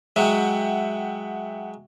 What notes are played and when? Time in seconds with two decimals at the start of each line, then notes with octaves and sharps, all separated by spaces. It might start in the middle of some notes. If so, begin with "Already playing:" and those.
0.16 F#3 G#3 E5 F#5 G5